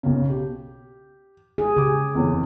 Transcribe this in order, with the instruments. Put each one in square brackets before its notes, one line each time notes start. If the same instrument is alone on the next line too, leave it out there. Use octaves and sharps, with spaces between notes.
[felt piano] B1 C#3
G4
[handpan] G#4
[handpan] C#3 [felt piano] G4 D6
[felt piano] F1 E2 C#5